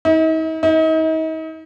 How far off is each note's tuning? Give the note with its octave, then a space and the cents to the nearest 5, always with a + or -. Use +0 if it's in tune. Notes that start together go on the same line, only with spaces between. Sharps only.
D#4 +45
D#4 +40